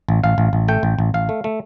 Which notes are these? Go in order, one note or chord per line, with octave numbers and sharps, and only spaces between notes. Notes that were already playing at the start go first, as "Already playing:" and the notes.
A1
A1 F5
A1
A1
A3 G5
A1
A1
A1 F5
A3
A3